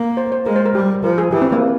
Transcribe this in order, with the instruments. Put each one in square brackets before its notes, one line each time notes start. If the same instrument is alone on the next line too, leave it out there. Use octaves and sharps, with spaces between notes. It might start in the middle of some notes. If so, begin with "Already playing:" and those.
Already playing: [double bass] A#3
[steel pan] C5
C5
[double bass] G#3 [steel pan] A#4
[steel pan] C5
A#4
[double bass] G3 [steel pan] G4
[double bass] F3 [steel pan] A#4
[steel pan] G#4
[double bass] E3 [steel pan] G4
[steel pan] C4
A#3